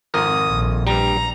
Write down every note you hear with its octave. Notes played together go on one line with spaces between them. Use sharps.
G#1 F2 A#4 D#6
A#1
G2 G3 A#5